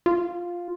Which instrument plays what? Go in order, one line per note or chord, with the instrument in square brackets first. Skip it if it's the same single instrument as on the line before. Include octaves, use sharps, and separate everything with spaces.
[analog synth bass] F4